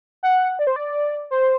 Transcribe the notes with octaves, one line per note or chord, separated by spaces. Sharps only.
F#5
D5
C5
D5
C5